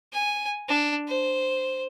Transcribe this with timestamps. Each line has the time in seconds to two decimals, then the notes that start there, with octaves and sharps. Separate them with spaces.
0.13 G#5
0.69 D4
1.08 C5